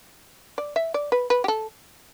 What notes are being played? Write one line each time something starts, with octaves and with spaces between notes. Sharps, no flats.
D5
E5
D5
B4
B4
G4
A4